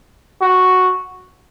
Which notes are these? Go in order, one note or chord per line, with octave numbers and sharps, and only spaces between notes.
F#4